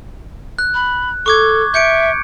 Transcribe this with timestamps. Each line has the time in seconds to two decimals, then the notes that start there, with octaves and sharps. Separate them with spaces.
0.59 F#6
0.74 B5
1.26 A4 C#6 D6 G#6
1.74 E5 G6 C#7 D7